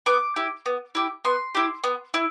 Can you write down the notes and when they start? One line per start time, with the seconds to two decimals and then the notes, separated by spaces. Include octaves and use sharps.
0.06 B3 D6
0.36 E4 G4
0.66 B3
0.95 E4 G4
1.25 B3 C6
1.55 E4 G4
1.84 B3
2.14 E4